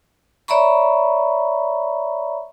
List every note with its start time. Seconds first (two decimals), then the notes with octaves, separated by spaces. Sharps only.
0.48 C#5 D5 E5 A#5 B5 C#6